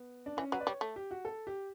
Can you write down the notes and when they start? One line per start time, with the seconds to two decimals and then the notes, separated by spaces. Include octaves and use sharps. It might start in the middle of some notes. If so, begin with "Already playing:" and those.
Already playing: B3
0.26 D4
0.37 E3 C#4
0.52 F#3 B4
0.60 D5
0.67 G3 C#5
0.81 A3
0.96 G4
1.11 F#4
1.25 A4
1.47 G4